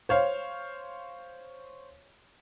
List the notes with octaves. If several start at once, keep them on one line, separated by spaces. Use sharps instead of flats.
C5 C#5 F5